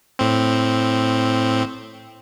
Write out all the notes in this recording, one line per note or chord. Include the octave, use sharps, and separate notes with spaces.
A2 C4